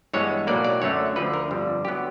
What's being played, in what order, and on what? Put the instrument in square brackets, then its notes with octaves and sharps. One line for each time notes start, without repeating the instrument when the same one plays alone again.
[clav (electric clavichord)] G2 E3 G#3 B3 C#5
B1 A2 F#3 A#3 D5
D5
F#2 D3 F#3 A3 C#5
D2 D3 F3 B4
A#4
G1 F2 D3 G3
D3 F#3 B3 G4